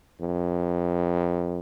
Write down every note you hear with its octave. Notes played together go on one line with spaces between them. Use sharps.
F2